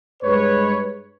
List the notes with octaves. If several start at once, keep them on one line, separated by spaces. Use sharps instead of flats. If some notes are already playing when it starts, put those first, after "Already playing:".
G2 G#3 B4 C#5